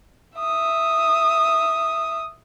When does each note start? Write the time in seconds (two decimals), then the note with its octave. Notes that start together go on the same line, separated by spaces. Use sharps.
0.38 E5 D#6